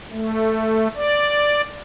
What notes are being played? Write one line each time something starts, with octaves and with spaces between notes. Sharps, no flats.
A3
D5